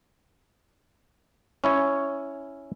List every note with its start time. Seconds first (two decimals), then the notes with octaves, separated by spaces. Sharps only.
1.64 C#4 E4 C#5